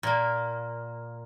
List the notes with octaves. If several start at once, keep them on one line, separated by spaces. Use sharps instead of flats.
A#2 A#3